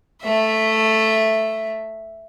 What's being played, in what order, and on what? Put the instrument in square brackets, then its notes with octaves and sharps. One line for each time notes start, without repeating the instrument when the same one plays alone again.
[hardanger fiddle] A3 E5